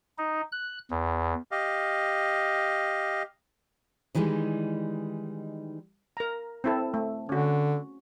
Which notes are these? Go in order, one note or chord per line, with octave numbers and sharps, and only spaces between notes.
D#4
F#6
E2
G4 D#5 F5
D#3 E3 G3 G#3 D#4
A#4 A#5
C4 E4 A4
A3
D3 C#4 F#4